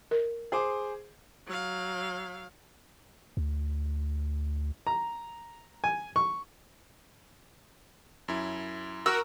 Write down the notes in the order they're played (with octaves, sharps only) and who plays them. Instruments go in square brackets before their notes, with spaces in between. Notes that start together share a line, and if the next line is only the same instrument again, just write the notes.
[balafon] A#4
[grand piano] G#4 C5 D6
[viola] F#3 F5
[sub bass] D2
[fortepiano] A#5
G#5
C#6
[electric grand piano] F#2 E4
[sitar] F#4 [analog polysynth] A#4 [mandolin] E6